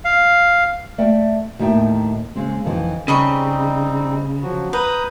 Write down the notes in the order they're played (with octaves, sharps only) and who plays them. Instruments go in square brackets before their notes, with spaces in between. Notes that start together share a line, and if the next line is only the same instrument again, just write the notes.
[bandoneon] F5
[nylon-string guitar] A3 D5 E5 G5
D#2 A2 D#3 E5 G5
C#3 G#3 C4
F2 D#3 E3
[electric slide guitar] C#3 [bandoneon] G3 C4 D#4 [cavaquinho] D#5 B5 C#6
[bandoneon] F3 F#3 F#4
[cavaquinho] B4 [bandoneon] A#5 D#6 G6